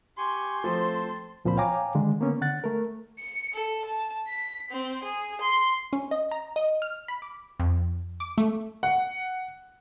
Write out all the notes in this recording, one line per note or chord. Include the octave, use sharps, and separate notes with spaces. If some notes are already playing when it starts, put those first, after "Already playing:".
G4 G#5 C6 C#6
F3 A3 C4 A5
C#2 A#2 F3 C4 C5 B5
C#5 F5 G5 G#5 A#5 D6
D3 D#3 G#3
D3 A#3 B3 C#4
D3 F#5 F#6 A6
A3 A#4
C#7
A4
A5
B6
C4
G#4
C6
C#4
D#5
A#5
D#5
F6
B5
D6
F2
D6
A3
F#5